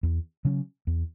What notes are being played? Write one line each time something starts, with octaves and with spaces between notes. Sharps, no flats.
E2
C#3 F#3 C#4
E2